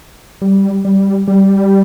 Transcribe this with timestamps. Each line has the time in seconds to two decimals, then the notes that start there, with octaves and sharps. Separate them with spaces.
0.42 G3
0.85 G3
1.28 G3